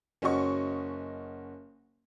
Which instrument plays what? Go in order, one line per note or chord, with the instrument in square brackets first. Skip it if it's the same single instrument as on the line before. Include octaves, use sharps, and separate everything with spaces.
[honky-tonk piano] F#1 C#4 F#4 D#5 C#6